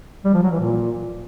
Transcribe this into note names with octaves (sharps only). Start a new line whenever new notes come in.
G3
F3
F#3
E3
A#2